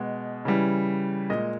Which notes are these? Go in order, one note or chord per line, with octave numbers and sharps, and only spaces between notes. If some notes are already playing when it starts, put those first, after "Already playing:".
Already playing: B2 G#3
C#3 E3 G3
A#2 G#3 D#5